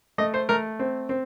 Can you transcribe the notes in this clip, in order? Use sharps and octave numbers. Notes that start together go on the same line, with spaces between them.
A3 D#5
C5
A3 A#4
C4
C4